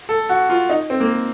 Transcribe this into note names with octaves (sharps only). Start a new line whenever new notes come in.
A4
F#4
F4
D#4
C4
A#3